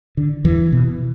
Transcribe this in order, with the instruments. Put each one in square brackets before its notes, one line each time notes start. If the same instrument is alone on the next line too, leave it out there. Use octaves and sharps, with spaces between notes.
[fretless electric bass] D3
E2 E3
B2